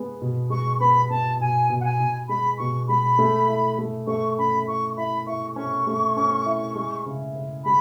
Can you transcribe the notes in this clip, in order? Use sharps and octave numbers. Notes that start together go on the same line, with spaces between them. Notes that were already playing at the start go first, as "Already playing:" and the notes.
Already playing: G#3 B3
B2
G#3 C#6
B3 B5
B3 A5
B2 G#5
B2
F#5
G#5
B2
G#3 B5
B2 C#6
G#3 B5
A3
E4
A3
A3 C#6
C#4 B5
E4 C#6
E4 B5
E4 C#6
C#4 C#6
A3
C#4
E4
G#3
C#3
C#3
G#3 B5